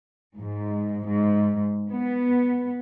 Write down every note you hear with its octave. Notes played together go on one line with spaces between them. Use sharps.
G#2
G#2
B3